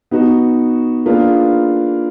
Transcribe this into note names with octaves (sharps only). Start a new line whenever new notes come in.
B3 D#4 F#4
A#3 D4 F4 G#4 B4